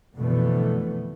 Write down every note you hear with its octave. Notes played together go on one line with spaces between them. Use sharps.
F2 B2 D3 E3 A3 B3